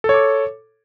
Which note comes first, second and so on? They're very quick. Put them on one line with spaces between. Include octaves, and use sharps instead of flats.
A4 C#5 D6